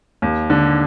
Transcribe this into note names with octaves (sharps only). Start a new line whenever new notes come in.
D#2
D3